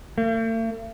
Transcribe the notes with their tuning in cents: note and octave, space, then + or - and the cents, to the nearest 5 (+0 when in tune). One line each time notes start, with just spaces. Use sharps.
A3 +45